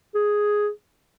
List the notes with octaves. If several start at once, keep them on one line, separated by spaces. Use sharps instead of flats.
G#4